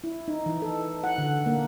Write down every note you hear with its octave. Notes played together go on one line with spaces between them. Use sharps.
E4
D#4
E3
A4
F#5
D3
A#3